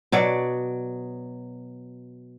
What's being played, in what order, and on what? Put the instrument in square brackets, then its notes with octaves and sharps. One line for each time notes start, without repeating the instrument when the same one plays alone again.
[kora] B2 F#3 C#5 D5